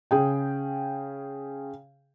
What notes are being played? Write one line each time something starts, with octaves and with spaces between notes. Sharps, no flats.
C#3 G#4 G5